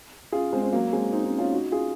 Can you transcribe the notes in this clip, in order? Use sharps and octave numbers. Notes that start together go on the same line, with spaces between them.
F4 G#4
G#3 C4
C4
F#3 A#3
G#3 C4
C4 D#4
C4 D#4
C#4 F4
D#4 F#4
F4 G#4